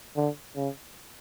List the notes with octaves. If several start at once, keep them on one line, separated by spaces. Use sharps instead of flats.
D3
C#3